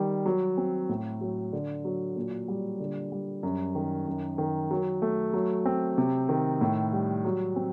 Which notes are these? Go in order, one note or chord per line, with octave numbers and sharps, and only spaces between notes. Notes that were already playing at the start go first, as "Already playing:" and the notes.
Already playing: D#3 G3
F#3
C4
A2
F#3
D3
F#3
A#2
G3
D3
G3
F#2
D#3
F#2
D#3
F#3
A3
F#3
C4
C3
D#3
A2
G3
F#3
C4